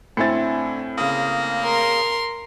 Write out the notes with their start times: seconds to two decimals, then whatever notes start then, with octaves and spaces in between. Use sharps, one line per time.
0.17 A2 D3 C4 E5 G#5 A6 C#7
0.98 C#3 A#3 F5 D#6
1.62 A#4 C6